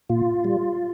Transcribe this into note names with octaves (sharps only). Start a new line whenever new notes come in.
A#2 F4
G3